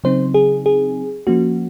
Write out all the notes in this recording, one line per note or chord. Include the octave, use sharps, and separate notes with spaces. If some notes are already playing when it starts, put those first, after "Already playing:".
C#3 F#3 C4 D#4 C5
G#4
G#4
F3 A#3 C#4 F#4